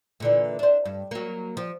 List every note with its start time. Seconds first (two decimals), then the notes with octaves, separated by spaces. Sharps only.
0.20 A#2 D3 E3
0.59 D4 C5
0.85 G2
1.11 F#3 A#3
1.57 F3